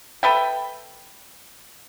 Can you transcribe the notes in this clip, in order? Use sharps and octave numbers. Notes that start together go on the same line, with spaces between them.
A4 B4 E5 G5